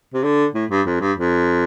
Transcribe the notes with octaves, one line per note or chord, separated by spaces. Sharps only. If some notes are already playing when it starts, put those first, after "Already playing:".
C3
D3
A2
G2
F2
G2
F2